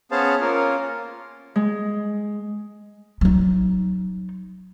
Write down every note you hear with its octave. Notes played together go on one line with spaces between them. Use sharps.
B3 C#4 G#4 C5 F5 A5
A#3 C#4 F4 A#4
G#3
F#3 D#4